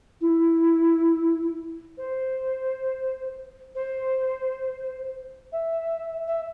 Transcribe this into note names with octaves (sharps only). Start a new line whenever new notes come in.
E4
C5
C5
E5
E5